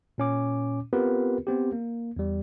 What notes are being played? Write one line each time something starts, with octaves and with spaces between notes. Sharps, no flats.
A#2 C#4 D6
B3 C4 F4 G4 A#4 B4
B3 C4 G4
A#3
E2 G3